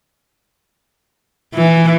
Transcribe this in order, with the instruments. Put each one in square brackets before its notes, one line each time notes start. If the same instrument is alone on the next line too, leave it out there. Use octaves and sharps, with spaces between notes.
[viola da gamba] E3